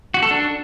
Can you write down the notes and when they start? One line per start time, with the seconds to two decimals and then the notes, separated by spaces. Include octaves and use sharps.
0.14 F#4
0.23 A4
0.31 D4